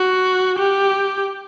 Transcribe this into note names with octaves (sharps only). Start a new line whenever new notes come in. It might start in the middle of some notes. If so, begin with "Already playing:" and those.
Already playing: F#4
G4